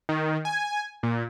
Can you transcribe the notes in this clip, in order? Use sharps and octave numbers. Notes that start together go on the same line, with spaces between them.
D#3
G#5
A#2